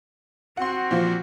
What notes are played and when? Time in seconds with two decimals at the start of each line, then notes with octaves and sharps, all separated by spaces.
0.57 C4 F#4 F#5 C6
0.91 A#2 E3 F3